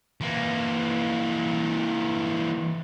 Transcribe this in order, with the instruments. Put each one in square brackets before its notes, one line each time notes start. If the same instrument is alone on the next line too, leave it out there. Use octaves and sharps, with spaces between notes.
[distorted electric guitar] E3 A#3